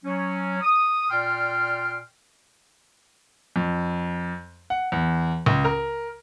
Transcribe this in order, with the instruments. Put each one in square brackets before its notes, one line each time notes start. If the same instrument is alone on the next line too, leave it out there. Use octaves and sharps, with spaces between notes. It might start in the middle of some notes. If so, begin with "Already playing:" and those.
[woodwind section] F#3 C#4
D#6
A#2 D5 G5 C6 F6
[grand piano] F2
F#5
E2
C#2
A#4